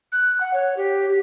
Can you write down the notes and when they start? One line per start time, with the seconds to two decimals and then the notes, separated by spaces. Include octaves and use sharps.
0.12 F#6
0.41 F#5
0.54 C#5
0.77 G4
1.09 G4